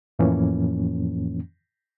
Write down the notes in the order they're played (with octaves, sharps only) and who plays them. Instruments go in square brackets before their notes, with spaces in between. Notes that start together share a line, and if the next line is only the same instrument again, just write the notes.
[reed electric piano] F2 A2 E3 F3 A#3 C#4